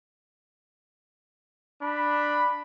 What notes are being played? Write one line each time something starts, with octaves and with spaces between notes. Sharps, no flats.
D4 B5